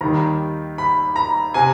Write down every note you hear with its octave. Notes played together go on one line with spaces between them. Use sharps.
D#2 D#3 G3 A#5
B5
A#5
C3 G#5